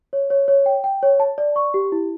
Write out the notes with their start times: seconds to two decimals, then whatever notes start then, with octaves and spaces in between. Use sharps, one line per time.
0.13 C#5
0.30 C#5
0.48 C#5
0.66 G5
0.84 G5
1.03 C#5
1.20 A5
1.38 D5
1.56 C#6
1.74 G4
1.92 E4